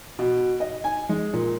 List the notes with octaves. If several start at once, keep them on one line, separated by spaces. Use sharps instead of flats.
B2
D#5
G#5
G#3
A#2